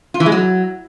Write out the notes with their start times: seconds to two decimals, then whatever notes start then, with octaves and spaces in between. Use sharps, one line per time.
0.14 F4
0.20 E3
0.26 G#3
0.32 F#3